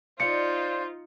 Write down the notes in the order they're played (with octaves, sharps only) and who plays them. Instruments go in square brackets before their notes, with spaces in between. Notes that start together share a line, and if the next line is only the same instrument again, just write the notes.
[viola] D#4 F4 [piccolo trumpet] C5 [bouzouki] D5 F5 G5 [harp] C#7